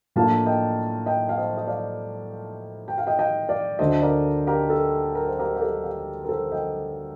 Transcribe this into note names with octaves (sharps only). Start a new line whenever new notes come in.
A2 F3 A#3 D4 F4 F5 A5
D#5 G5
D#5 G5
F5
C5 D#5
D#5
D5 F5
G5
F5
D#5 G5
D#5 G5
D5 F5
D2 D3 A3 D4 C5 D#5
A#4 D5
G4 A#4
A4
A#4
C5
G4 A#4
G4
A4
G4
A#4
A4 C5
D#5 G5